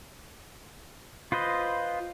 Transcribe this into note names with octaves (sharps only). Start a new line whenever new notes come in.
F4 B4 C5 D#5